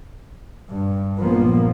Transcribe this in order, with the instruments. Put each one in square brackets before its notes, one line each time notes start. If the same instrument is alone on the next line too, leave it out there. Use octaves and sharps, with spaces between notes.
[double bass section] G2
A#1 F3 A#3 B3